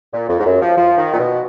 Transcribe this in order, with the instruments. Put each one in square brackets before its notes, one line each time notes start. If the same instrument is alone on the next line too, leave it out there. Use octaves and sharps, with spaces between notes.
[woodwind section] A#2
F2
G#2
F#2
F3
F3
D#3
A#2
B2